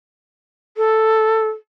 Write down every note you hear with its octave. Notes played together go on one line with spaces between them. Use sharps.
A4